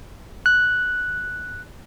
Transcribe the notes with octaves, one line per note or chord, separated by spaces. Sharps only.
F#6